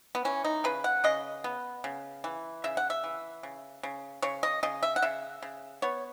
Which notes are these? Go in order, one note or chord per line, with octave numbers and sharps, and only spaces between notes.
B3
E3 C#4
D#4
C#3 B4
F#5
C#3 D#5
B3
C#3
E3
C#3 E5
F#5
E5
E3
C#3
C#3
C#3 C#5
D#5
C#3 D#5
E5
F#5
C#3 E5
C#3
B3 C#5